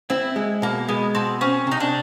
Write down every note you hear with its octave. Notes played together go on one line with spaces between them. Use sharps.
C4 E4
G#3
B2 A#3
G#3 B3
B2 C4
C4 C#4
C3 D#4
D4